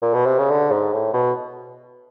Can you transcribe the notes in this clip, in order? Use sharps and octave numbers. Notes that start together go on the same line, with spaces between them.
A#2
B2
C3
C#3
D3
G#2
A2
B2